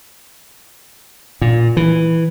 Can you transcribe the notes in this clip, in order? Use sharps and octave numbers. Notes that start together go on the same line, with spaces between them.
A#2
E3